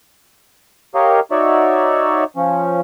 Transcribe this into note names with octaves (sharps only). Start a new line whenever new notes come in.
G4 A#4 C#5 D#5 F5
D#4 F#4 C#5 D5 E5
F3 C#4